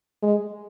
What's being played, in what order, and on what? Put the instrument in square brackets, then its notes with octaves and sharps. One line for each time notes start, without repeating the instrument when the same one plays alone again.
[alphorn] G#3